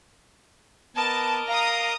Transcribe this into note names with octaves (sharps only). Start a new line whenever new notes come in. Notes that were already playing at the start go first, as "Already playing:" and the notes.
B3 A#4 D#5 A5 D6
F5 A#5 D#6